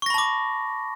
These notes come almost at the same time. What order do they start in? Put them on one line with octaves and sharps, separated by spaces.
C#6 A#6 B5 A5 D6